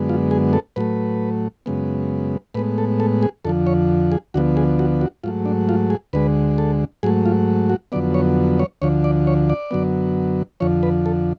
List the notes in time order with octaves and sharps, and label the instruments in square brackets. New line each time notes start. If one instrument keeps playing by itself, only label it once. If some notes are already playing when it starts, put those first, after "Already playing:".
Already playing: [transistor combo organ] F#2 D3 G#3 B3
F4
G#4
A4
A2 F#3 A3 B4
F#2 C#3 G#3 B3
A2 G#3 B3 B4
A4
A4
G#4
F2 D3 F3 A4
C#5
G#4
D2 D3 F3 B3 F#4
G#4
F#4
F#4
G#2 F#3 A3 F4
D4
F4
G#4
D2 D3 G#3 B4
A4
G#2 F#3 A3 G#4
F4
F#4
F2 D3 F#3 B3 D5
C#5
C#5
D2 D3 F3 C#5
D5
C#5
D5
F#2 D3 F#3 B3
F2 D3 F3 C#5
B4
A4